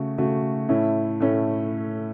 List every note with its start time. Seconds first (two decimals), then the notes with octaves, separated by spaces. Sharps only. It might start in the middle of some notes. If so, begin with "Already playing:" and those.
Already playing: C#3 A3 F#4
0.18 C#3 A3 F#4
0.69 A2 A3 C#4 E4
1.20 A2 A3 C#4